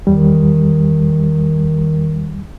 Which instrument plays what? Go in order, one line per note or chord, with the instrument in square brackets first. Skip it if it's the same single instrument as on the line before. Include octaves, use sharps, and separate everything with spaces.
[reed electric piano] E2 G3 [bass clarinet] D#3